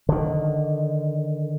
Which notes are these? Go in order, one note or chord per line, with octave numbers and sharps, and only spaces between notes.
D3 D#3